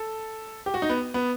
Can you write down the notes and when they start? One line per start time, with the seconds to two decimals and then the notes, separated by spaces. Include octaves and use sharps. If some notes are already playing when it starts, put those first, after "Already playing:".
Already playing: A4
0.66 G4
0.74 F#4
0.82 D#4
0.90 B3
1.14 B3